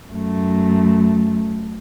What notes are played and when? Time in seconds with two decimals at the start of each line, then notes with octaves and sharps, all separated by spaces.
0.13 F#2 A3